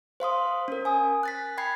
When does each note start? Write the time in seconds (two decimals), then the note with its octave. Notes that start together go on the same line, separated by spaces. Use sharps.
0.20 C5 F5 C6 D#6
0.68 C#4 A#4
0.85 G#5 D#6
1.23 F#6 A6 B6
1.58 G5 B5 G#6 C7